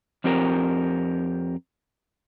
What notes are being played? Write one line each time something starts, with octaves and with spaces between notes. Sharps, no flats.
F2 C4 G4 A#4